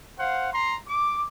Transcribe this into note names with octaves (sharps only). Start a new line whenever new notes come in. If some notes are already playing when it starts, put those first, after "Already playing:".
C5 F5 F#5
A#5 C6
D6